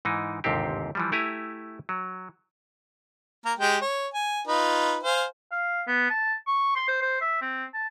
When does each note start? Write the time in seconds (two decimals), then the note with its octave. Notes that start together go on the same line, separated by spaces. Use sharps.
0.05 G#2 E3 D#4
0.44 G1 D#2 G#2 C3 C4 G4
0.95 E3 F3 G3
1.12 A3 E4 G4 G#5 A#5
1.89 F#3
3.45 A#3 A#4
3.59 G#3 G4 G5
3.81 C#5
4.14 G#5
4.47 D#4 F4 B4
5.03 C5 F5 G#5
5.52 F5
5.88 B3
6.10 A5
6.47 C#6
6.75 C6
6.88 C5
7.02 C5
7.21 E5
7.42 C4
7.74 A5